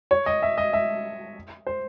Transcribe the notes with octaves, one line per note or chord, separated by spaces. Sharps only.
C#5
D#5
E5
D#5
E5
C5